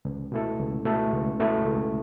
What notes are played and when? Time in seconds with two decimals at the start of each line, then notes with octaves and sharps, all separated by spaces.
0.05 C#2
0.32 B2 A3 E4 A4
0.59 C#2
0.85 B2 A3 E4 A4
1.12 C#2
1.39 B2 A3 E4 A4
1.65 C#2